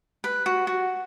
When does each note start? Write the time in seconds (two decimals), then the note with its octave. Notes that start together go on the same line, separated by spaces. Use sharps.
0.24 B4
0.46 F#4
0.67 F#4